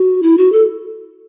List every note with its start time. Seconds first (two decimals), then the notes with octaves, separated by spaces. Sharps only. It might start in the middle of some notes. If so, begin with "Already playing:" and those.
Already playing: F#4
0.22 E4
0.37 F#4
0.52 A4